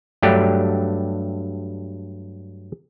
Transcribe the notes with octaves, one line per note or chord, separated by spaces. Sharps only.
G2 F#3 A3 D4 G4